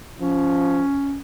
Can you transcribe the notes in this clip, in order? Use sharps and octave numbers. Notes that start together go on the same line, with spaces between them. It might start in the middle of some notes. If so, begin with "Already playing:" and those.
F3 C#4